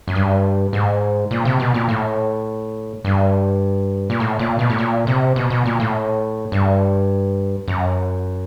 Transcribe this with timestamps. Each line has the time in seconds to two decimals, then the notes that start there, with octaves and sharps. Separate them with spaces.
0.08 F#2
0.15 G2
0.73 G#2
1.31 A#2
1.45 C3
1.60 B2
1.74 A#2
1.89 A2
3.05 G2
4.10 A#2
4.20 A2
4.39 A#2
4.59 B2
4.70 A2
4.78 A#2
5.07 C3
5.36 B2
5.50 B2
5.65 A#2
5.80 A2
6.52 G2
7.68 F#2